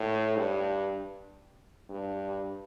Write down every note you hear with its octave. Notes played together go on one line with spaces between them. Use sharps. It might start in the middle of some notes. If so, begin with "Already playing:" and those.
Already playing: A2
G2
G2